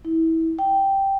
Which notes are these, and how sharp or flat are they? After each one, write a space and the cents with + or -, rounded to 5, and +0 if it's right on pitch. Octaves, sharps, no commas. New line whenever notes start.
E4 -25
G5 -5